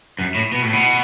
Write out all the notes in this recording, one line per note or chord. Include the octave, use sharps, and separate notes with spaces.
F#2
A2
B2
A2
B2